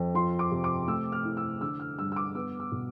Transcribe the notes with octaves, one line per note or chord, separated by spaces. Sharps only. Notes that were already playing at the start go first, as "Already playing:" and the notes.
Already playing: F2
F3 C6
D6
C3
D6
A3 E6
F6
E4
E6
D3 E6
F6
G2 E6
E6
D6
B3 E6
E6
B2